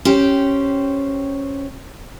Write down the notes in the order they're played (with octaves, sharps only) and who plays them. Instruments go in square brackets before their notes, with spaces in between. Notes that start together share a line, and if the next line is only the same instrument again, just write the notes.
[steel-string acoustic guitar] C#4 G4 C5 G5